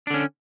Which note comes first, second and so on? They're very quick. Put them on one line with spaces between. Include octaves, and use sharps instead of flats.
D4 D3 C#4